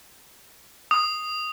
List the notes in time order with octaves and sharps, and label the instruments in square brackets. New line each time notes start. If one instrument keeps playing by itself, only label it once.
[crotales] D#6